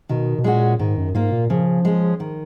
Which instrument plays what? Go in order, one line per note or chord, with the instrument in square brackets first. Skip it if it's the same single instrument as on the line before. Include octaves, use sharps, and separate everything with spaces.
[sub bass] B2 [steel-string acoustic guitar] D#3
[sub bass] B2
[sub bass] A#2 [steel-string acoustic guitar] G#3 C#4 F#4
[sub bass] G#2 [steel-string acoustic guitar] D#3
[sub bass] F#2
[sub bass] G#2 [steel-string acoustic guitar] A#3 F4
[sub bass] A#2
[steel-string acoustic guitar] C#3 [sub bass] F3
[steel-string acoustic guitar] G#3 C#4
D#3